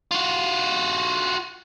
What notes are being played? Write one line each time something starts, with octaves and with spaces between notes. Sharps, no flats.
F4 F#4